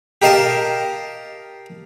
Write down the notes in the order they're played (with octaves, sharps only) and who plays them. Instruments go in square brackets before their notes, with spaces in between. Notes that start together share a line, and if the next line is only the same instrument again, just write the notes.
[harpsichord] G4 A#4 D#5 F5 A5